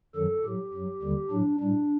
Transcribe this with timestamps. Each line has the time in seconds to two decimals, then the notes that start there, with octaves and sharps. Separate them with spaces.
0.16 F#2 D#3 F#3 A4
0.44 A2 F#3 G4
0.73 F#2 F#3
1.02 D#2 D3 G3
1.31 A2 F#3 D4
1.60 A2 G3 D4